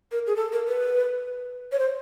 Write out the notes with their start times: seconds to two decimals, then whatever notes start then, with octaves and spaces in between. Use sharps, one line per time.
0.12 A#4
0.27 G#4
0.36 A4
0.52 A#4
0.68 B4
1.72 C#5
1.79 C5